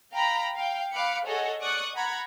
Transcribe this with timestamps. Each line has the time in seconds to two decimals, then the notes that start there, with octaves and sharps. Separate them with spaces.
0.12 F5 G5 A#5 B5
0.55 F5 G5
0.93 F5 B5 D6 F#6 C#7
1.25 G#4 A4 C#5 D#5 F#5
1.60 D5 C#6 D#6 F#6 C#7
1.95 F#5 A#5 B5 G#6